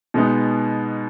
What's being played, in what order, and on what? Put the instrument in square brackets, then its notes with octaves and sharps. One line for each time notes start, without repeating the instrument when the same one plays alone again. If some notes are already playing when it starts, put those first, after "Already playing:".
[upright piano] B2 G#3 B3 D#4